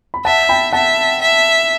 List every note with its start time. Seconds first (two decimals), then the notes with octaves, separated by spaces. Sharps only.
0.14 B5
0.25 E5 F#5 A5
0.49 G5 B5
0.73 E5 F#5 A5
1.21 E5